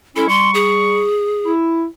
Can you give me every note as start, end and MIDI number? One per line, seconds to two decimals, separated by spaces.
0.16 0.25 56
0.16 0.25 61
0.16 0.25 64
0.16 0.27 69
0.29 1.05 55
0.29 0.50 84
0.29 1.05 85
0.54 1.51 68
1.45 1.84 64